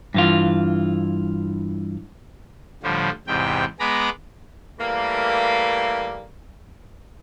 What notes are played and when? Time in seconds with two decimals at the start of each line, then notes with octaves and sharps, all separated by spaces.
0.14 G2 E3 F4
2.83 A2 D3 F3 G3
3.27 E2 G#2 C3 G5
3.80 G#3 B3 G#4 A#5 B5 D6
4.79 E3 G3 A3 A#3